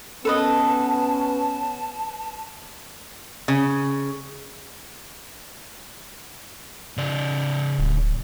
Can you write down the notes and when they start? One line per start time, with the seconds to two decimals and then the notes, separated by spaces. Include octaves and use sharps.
0.25 B3 C#4 A4 B4 D#5 A5
3.48 C#3
6.97 C#3 D5
7.78 D1